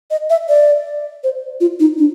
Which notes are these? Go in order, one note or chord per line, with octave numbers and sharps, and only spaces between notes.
D#5
E5
D5
C5
F4
D#4
D4